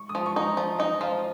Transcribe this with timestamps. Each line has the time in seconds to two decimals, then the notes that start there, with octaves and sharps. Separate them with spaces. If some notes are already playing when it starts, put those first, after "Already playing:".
Already playing: C#6
0.09 D#6
0.15 F3
0.26 C#6
0.36 D#4
0.42 A#5
0.57 F3
0.79 D#4 D#5
1.01 F3 F5